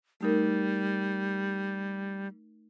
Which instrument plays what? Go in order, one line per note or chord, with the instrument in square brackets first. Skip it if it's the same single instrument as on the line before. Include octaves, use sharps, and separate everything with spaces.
[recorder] G3 [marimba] A3 D#4 A#4